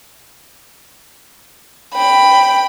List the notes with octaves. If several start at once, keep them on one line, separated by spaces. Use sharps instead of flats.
G5 B5